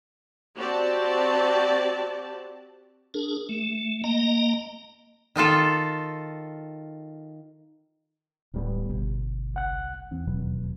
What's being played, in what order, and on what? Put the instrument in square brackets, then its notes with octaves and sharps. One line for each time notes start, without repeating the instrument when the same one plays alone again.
[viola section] C4 F#4 G4 D5 A5
[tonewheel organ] D4 G#4 A#4
A3
A#3 D#5 A#5
[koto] D#3 D#4 F4 A4
[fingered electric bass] D1 [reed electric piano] A2 G3 B3
[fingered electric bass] G1 [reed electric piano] B2
[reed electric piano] C2 F#5 F#6
[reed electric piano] E2 [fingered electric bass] C4
[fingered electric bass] D#1 B2 F#3